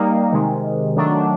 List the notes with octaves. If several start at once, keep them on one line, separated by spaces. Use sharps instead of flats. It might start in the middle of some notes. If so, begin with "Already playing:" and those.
Already playing: G3 A#3 D#4
C3 D#3 G#3
D#3 F#3 A3 D4